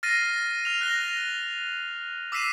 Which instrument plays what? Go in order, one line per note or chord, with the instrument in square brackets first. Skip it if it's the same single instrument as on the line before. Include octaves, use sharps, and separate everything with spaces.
[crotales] F6 A6 A#6 C7 D#7
F6 F7
F#6 A#6 G7
D6 E6 B6 C7 D#7 E7